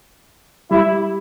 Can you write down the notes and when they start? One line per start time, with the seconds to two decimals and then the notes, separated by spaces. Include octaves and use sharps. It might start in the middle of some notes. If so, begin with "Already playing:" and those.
0.71 G3 E4